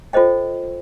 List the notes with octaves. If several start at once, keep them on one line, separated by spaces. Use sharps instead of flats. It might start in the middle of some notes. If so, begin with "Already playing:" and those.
F4 A4 C5 D#5 G5